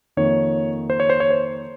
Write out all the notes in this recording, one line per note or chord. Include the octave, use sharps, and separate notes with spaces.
F2 D#3 A#3 C#5
C5
C#5
C5
C#5
C5